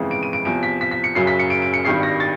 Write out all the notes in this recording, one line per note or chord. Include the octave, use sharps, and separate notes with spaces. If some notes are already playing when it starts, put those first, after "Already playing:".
Already playing: G1 F2 C#3 E3 G#3
D7
D#7
D7
E2 C3 F3 D7
B6
B6
B6
C#7
F#1 F#2 C#3 F#3 C7
B6
C#7
D7
D7
C#7
G#1 G2 D#3 G3 C7
A#6
A6